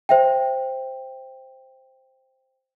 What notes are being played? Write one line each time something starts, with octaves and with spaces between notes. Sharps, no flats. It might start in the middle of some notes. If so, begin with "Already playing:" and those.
C5 E5 G5